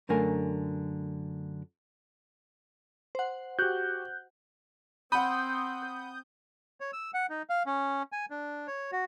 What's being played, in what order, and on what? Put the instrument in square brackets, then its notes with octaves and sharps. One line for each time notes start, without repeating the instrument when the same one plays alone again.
[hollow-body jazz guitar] F#2 D3 A3 A#4 G#5
[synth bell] C5 F#5
[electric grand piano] F#4 G4 [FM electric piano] F#6 G6
[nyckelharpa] C4 C5 [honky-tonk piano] F#5 B5 [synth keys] D#6 G6
[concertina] C#5
E6
F#5
D#4
F5
C#4
G#5
D4
C#5
F#4